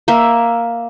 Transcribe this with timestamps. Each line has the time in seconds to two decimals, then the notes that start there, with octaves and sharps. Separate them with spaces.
0.08 A#3 E5